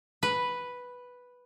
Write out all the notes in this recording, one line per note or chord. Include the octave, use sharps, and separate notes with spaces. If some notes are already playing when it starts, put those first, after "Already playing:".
B4